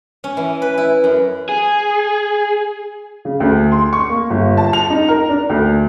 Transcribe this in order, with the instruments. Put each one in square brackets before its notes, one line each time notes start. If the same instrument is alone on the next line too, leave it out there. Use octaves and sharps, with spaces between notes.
[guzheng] C#4
E3
B4
E4
F#2
[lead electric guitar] G#4
[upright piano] C#3
D2
C6
C#6
A#3
G1
A5
F7
D#4
A#4
D4
D2